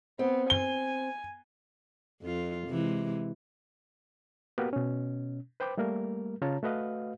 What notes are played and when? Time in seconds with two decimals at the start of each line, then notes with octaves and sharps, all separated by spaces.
0.19 B3 C4
0.50 G#5 G7
2.23 F2 F4
2.68 C3 E3 G#3
4.58 A#3 B3 F#4 G4 A#4 B4
4.73 B2 C#4
5.60 B4 C5 G5 B5 D6
5.77 G3 A3 A#3 A#4
6.42 C#3 F4 C#5 A5 A#5
6.63 A3 F#4 B4 D#5 F5